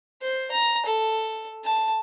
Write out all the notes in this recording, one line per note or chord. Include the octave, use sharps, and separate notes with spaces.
C5
A#5
A4
A5